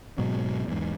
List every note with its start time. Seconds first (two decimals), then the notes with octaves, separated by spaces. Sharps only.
0.18 G#2 B2 F#3
0.68 E2 G#2